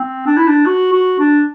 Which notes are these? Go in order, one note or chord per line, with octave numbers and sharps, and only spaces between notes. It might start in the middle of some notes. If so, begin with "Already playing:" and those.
Already playing: C4
D4
E4
D4
F#4
F#4
D4